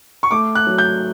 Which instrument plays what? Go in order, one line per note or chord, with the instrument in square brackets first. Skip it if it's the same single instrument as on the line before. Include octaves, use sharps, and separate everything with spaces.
[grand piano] C#6
A3 D6
F#6
F#3
G6